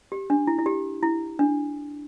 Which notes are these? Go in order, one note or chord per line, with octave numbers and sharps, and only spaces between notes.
G4
D4
E4
E4
G4
E4
D4